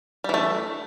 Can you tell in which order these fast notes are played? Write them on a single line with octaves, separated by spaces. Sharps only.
G3 E3 A3